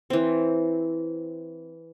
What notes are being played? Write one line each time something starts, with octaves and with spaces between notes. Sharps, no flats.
E3 C4